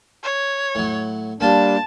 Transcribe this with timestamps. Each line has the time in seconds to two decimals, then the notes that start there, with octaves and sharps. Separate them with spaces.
0.23 C#5
0.75 A2 F#3
1.40 G3 A#3 D4 F4 G4 A5